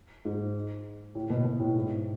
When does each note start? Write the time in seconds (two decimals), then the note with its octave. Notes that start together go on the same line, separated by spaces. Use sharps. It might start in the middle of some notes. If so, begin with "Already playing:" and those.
0.25 G#2
1.15 A2
1.30 B2
1.45 B2
1.60 A2
1.75 G#2